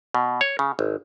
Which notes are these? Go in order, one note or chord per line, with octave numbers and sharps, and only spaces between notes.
B2
C#5
C#3
G#1